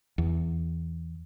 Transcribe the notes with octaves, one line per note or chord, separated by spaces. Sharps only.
E2